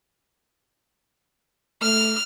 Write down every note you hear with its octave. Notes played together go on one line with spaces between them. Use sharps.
A3 F6